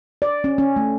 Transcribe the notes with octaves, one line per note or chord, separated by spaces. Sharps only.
D5
C#4
C#4
A3